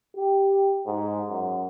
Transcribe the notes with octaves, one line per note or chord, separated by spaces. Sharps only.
G4
G#2
F#2